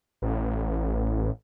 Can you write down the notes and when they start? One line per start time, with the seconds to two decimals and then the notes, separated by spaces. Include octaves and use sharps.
0.22 A1